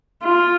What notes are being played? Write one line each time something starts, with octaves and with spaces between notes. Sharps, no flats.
F4